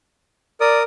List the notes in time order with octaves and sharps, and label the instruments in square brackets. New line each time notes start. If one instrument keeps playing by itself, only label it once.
[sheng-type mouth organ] A#4 D#6 [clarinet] D5